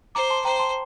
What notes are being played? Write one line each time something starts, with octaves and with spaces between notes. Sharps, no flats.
C5 A#5 D6
A5 C6
C5 G5 A#5
A5 C6